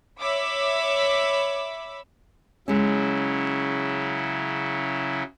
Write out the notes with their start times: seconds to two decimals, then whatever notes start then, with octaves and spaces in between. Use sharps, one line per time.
0.21 C#5 E5 B5 D6 E6
2.68 C#3 F#3 G#3 C#4 E4